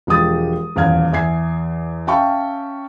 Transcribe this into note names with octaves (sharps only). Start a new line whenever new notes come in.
E1 F3 G#3 G4 D#6 A6
D#1 E2 F5 F6 G#6
E2 E5 G#5 G#6 C7
C#4 E5 F5 G5 A5 C#6